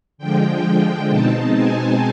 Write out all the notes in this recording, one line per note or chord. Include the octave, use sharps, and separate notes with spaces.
D3 F3 G#3 G5
B2 G#3 C4 D#4 A5
G#5